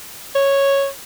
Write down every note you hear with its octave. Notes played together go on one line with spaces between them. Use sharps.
C#5